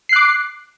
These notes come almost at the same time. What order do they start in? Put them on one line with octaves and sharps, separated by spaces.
C7 F#6 D6